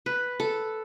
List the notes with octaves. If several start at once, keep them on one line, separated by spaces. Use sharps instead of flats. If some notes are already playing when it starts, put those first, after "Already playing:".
B4
A4